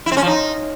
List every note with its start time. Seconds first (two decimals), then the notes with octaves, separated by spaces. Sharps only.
0.06 E4
0.11 C4
0.17 C#4
0.22 F3
0.27 D#4